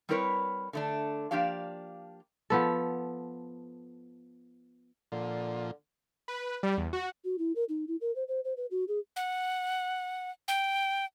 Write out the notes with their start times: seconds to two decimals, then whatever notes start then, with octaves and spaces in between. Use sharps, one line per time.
0.09 G3 C4 E4 A#4 B4 C#5
0.73 D3 A3 D4
1.31 F3 A#3 D4 G4 D5 F5
2.50 F3 B3 A4
5.12 A#2 D3 F3
6.28 B4
6.63 G3
6.77 E2
6.93 F#4
7.25 F#4
7.39 E4
7.56 A#4
7.69 D#4
7.88 E4
8.01 A#4
8.16 C5
8.28 C5
8.44 C5
8.57 B4
8.71 F#4
8.88 G#4
9.16 F#5
10.48 G5